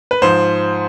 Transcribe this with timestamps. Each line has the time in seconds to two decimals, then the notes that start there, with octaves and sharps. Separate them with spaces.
0.11 B4
0.22 G#2 F3 C5